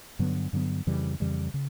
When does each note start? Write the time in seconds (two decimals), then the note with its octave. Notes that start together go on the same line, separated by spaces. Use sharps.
0.19 G2 D3 F#3 B3
0.53 G2 D3 F#3 B3
0.87 F2 C#3 E3 G3
1.20 F2 C#3 E3 G3
1.54 C#3